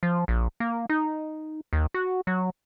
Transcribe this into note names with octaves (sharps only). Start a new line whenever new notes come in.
F3
A#1
A#3
D#4
D#2
F#4
F#3